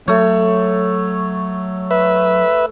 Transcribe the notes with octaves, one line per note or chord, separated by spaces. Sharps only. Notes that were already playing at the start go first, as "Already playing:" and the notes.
F#3 A3 C#5
B4 E5